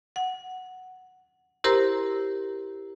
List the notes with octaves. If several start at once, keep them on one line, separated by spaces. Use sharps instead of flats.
F#5
E4 G4 A#4 C5 A#5 C6